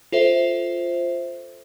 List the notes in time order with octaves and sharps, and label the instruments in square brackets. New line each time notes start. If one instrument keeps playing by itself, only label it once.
[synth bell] F4 A4 C5 E5